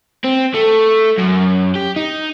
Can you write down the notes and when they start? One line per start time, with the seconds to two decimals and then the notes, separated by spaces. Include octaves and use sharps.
0.25 C4
0.55 A3
1.18 F#2
1.75 G4
1.96 D#4